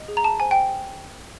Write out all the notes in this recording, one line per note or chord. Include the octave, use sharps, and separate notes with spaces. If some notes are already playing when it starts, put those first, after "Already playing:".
Already playing: D#5
G#4
A#5
A5
C5 G#5
G5